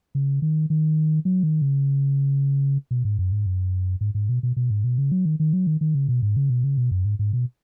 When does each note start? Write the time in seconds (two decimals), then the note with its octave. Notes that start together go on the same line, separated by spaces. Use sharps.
0.15 C#3
0.42 D#3
0.70 D#3
1.25 F#3
1.43 D#3
1.62 C#3
2.91 B2
3.05 G#2
3.19 F#2
3.32 G#2
3.46 F#2
4.01 G#2
4.15 G#2
4.29 B2
4.43 B2
4.57 B2
4.71 G#2
4.84 B2
4.98 C#3
5.12 F#3
5.25 D#3
5.40 D#3
5.53 F#3
5.67 D#3
5.81 D#3
5.95 C#3
6.09 B2
6.22 G#2
6.36 C#3
6.50 B2
6.64 C#3
6.78 B2
6.91 F#2
7.05 G#2
7.19 G#2
7.33 B2